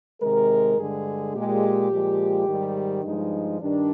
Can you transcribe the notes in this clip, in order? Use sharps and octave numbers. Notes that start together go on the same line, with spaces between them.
C3 D#3 G#3 A#4
G2 D3 G#3 G#4
A#2 G#3 G4
A#2 F3 G#3
G#2 D#3 G3
G2 F3 G#3 D#4
G2 D#3 G3 D4